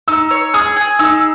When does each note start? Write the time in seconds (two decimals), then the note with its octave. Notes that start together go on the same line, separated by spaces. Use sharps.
0.08 D#4 E6
0.31 C#5
0.54 G#4 D#6
0.76 G#4
0.99 D#4 E6